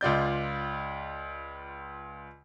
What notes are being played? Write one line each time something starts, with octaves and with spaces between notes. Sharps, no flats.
C#2 F4 D5 G6